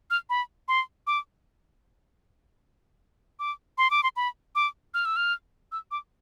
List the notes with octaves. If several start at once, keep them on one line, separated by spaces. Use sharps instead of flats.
F6
B5
C6
D6
D6
C6
D6
C6
B5
D6
F6
E6
F6
E6
D6